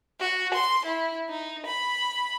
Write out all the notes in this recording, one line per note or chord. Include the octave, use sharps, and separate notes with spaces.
F#4
C6
E4
D#4
B5